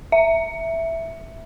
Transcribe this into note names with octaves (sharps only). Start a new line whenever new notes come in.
E5